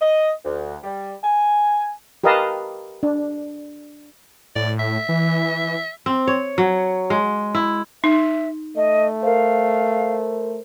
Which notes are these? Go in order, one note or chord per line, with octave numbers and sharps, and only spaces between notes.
D#5
D2
G3
G#5
G4 A#4 B4 D#5 F5 A5
D4
A2 D5
E5
E3
C4
C#5
F#3
G#3
E4
D#4 E5
A3 D#5
A#4 C5 F5